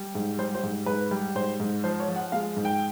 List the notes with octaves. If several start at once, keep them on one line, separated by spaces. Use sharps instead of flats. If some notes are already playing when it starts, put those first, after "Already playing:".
Already playing: G3
G#2
G3 C5
C5
G#2
G#2 B4
G3
G#2 C5
G#2
F3 C5
C#5
F3
F#5
G#3 F5
G#2
G5